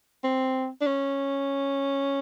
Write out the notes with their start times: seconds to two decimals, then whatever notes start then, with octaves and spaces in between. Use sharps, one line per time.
0.24 C4
0.81 D4
0.87 C#4